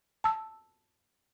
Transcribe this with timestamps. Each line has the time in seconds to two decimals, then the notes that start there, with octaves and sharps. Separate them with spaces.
0.24 A5 E6